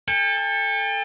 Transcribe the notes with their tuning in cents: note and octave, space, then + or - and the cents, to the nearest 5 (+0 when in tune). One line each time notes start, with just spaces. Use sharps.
A4 +0 G5 +40